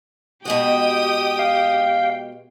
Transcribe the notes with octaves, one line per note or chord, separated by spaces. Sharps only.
B2 G#3 F#4 G4 G5 D#6
F5